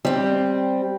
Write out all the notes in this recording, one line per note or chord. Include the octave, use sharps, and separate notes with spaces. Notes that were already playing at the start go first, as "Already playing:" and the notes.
G3 C4